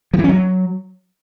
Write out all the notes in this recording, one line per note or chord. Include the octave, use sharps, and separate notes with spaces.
F3
E3
C#4
F#3